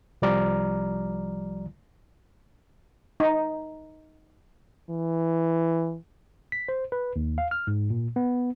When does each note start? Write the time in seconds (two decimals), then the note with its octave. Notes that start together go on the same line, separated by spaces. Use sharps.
0.22 C2 F3 G3 D5 A#5 F6
3.20 D#4
4.90 E3
6.52 B6
6.69 C5
6.92 B4
7.16 D#2
7.38 F5
7.51 F6
7.67 G#2
7.90 A#2
8.16 B3